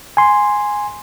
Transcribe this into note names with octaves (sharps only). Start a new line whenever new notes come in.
G#5 C6